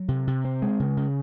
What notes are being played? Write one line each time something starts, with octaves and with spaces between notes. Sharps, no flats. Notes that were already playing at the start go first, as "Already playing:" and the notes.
Already playing: F#3
C3
C3
C4
G#3
C#3
C#3